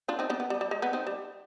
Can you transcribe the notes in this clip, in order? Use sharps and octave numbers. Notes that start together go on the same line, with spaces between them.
D4 F4
C4 D#4
B3 D4
B3
G3
G3
G#3
B3
C4 D#4
G3